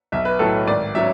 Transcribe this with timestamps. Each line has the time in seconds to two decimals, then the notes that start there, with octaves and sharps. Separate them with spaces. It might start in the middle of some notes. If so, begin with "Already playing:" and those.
0.12 B1 E5
0.25 B4
0.39 A2 F#3 A4
0.67 G#1 D5
0.95 F#3 C#4 E5